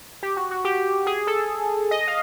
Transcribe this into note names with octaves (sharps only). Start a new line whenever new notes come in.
G4
F#4
F#4
G4
G#4
A4
D#5
F5